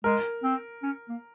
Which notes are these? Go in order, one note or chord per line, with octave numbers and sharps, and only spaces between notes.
G#3 A#4
C4
C#4
A#3